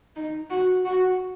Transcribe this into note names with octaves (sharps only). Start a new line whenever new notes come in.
D#4
F#4
F#4